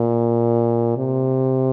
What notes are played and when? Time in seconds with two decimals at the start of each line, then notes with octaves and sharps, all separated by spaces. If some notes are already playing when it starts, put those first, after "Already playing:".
Already playing: A#2
0.97 C3